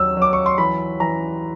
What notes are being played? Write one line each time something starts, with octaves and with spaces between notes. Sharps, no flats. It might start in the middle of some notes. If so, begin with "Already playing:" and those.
Already playing: D#2 F#3 E6
F#3 D6
C#6
C6
E3 B5
E3 A#5